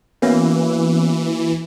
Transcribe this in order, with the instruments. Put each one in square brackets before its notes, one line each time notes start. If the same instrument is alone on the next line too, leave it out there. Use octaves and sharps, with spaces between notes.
[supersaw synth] E3 [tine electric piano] A#3 F#4 [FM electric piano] B3 C#4